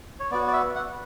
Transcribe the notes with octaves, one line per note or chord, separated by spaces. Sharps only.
C#5
B3 F#4 D5
D5
E5
F#5